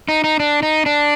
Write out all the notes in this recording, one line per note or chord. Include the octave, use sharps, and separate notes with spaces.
D#4
D#4
D4
D#4
D4